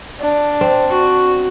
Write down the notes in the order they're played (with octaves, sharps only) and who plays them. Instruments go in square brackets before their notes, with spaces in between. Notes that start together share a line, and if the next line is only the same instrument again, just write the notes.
[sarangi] D4
[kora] C4
[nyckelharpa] F#4